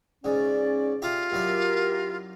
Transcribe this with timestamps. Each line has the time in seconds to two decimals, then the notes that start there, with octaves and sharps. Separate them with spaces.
0.24 G#2 C#3 C#4 D5
1.02 F4 G4 E5 A#5
1.32 F#2 E4 G4 A#4 D5